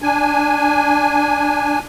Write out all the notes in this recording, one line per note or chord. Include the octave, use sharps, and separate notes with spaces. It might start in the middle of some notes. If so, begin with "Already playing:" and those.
D4 G#5